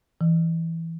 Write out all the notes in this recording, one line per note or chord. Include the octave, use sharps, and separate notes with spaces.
E3